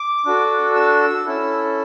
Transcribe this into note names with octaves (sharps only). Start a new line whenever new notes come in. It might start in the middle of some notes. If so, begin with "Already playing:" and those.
Already playing: D6
D4 F#4 A4
E6
C#4 E4 A4